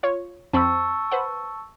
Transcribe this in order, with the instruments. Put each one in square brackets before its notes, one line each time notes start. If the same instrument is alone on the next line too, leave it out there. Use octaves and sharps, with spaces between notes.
[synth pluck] F4 C#5
[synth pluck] F2 C4 B5 [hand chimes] A5 C#6 E6
[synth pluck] B4 C5 F#5